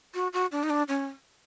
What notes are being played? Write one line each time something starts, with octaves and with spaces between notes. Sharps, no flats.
F#4
F#4
D4
D#4
D4
C#4